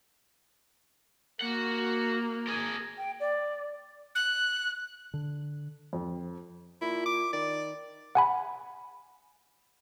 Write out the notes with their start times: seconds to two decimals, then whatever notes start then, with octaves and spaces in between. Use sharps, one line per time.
1.41 A#3 F#4 F#5
2.47 G#4 A#4
2.98 G5
3.20 D5
4.15 F#6
5.14 D3
5.93 F2
6.81 A#2 E4
7.06 D6
7.33 D#3 D5
8.15 F#5 G#5 B5